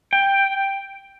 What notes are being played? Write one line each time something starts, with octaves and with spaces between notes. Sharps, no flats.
G5